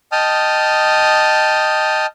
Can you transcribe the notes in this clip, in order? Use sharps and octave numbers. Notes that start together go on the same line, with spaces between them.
D#5 G5 A5 D#6 F6